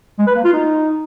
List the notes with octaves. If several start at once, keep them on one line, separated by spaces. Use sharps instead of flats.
G#3
B4
A#3
F4
D#4